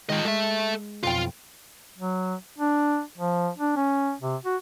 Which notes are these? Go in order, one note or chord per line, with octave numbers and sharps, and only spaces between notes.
D#3 G#3 F4 D#5
G#3 A4 E5
B1 F2 F4 G5
F#3
D4
F3
D4
C#4
C3
F#4